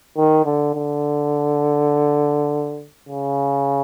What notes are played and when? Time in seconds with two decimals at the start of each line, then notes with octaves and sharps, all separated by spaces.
0.17 D#3
0.46 D3
0.75 D3
3.09 C#3